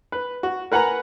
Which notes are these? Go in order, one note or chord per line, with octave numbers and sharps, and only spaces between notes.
B4
F#4
A#4 B4 F#5 G#5 A#5